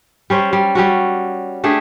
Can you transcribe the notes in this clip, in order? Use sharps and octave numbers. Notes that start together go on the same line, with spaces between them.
G3 C#4 C5
G3
G3 C#4 F#4
A3 D4 G4 G#4